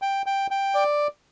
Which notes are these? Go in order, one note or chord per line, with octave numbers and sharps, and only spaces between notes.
G5
G5
G5
D5